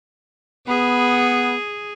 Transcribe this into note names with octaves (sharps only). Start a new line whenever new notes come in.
B3 G#4